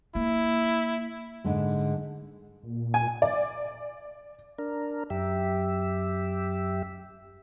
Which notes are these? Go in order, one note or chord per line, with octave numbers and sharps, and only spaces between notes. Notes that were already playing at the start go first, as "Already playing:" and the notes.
A#3 E4
G#2 D3 G#3
A#2
G#5
D5
D4 A#4
F#2 G4 E5